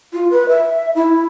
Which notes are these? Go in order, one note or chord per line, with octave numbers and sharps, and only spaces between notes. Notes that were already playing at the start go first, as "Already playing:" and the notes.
F4
B4
E5
E4